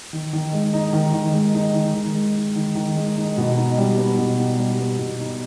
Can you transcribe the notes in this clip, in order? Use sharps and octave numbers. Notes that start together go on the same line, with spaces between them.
D#3
D#3
G#3
D#4
D#3
D#3
G#3
D#4
D#3
D#3
G#3
D#4
D#3
D#3
G#3
D#4
B2
D#4
G3
B3
B2
D#4
G3
B3
B2
D#4